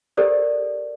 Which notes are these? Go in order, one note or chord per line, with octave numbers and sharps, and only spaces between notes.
G4 A4 A#4 C5 D5